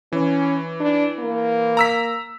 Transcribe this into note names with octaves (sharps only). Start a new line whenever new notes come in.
E3 C#4
D4
A#3
A#5 E6 B6